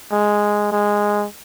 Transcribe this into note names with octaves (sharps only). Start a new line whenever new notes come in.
G#3
G#3